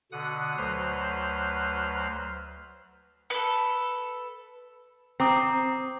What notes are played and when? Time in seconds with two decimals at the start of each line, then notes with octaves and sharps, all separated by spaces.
0.12 B2 D3 F#5 D#6
0.57 D2 F#3 B4 C5 F6
3.30 A4 B4
5.20 C4 A#5 D6 D#6